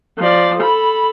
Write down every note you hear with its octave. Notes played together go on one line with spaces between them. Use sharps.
F3 D5
A4 B5